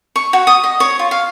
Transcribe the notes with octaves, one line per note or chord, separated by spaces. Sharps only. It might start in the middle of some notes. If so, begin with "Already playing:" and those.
C#6
F#4
D#6
D#5
C#5
F4
F5